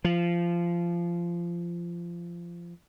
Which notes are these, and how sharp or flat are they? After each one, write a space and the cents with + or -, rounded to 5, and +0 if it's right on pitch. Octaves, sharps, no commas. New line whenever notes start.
F3 -20